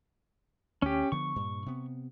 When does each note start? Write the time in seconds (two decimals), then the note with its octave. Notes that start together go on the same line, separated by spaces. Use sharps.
0.82 D2 C#4 G4
1.12 D3 F3 B3 C#6
1.36 G2 A#2
1.66 C3 B3